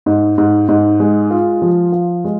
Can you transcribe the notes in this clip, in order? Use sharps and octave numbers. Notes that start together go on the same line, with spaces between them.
G#2
G#2
G#2
G#3
F4
F3
F4
G#3